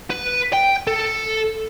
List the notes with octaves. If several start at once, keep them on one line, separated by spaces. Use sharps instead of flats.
B4
G5
A4